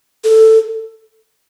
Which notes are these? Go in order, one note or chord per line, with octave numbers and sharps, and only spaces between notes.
A4